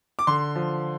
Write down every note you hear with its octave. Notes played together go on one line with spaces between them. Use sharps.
D6
D3 C6
F3